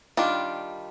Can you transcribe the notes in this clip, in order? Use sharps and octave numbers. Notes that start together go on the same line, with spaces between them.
D#3 G3 D4 F4